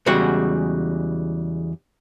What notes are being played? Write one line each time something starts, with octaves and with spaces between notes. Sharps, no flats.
E2 C#3 G3 G#3 F#4 F#5